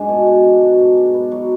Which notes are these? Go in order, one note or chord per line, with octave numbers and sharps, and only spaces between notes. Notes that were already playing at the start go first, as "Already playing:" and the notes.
Already playing: G#2 G#3 D4
B2
B2
D4
F#3
G#2
G#2
B3
F#3